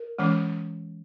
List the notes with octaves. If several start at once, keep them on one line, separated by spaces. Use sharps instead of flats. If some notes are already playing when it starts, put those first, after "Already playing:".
Already playing: A#4
E3 G#3 C#4